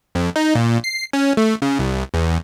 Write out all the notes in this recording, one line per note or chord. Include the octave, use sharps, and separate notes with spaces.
F2
D#4
A#2
C7
C#4
A3
C#3
C2
E2